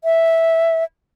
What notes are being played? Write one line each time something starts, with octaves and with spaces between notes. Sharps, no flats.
E5